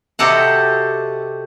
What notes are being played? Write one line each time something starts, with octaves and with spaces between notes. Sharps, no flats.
C3 F#4 G4 A4 D#5 F#5